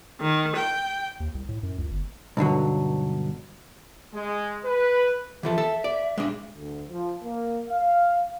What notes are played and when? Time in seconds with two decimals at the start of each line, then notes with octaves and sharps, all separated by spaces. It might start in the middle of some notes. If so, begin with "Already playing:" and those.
0.21 D#3
0.55 G5
1.20 D#2
1.35 C2
1.48 A2
1.63 F#2
1.78 C#2
1.91 G1
2.37 B1 G2 D3 F#3
4.14 G#3
4.65 B4
5.43 E3 F3 A4 E5
5.58 A4
5.84 D5
6.18 G#3 D4
6.53 D2
6.88 F3
7.23 A#3
7.68 F5